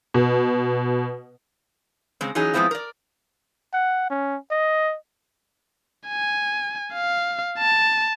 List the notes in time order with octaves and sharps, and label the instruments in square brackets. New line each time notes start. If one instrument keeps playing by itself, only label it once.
[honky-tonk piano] B2
[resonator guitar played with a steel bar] C#3 G#3 C4
E3 F#3 C#4 D#4 G#4
F3 G#3 B3 C4 E4 F4
A#4 D5
[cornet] F#5
C#4
D#5
[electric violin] G#5
F5
A5